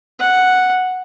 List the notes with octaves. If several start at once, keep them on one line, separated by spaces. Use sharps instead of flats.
F#5